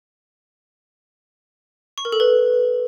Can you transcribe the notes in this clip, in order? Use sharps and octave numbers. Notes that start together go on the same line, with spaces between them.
C#6
A#4
A4
B4